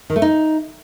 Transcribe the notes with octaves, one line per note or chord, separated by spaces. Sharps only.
D#3
A3
D#4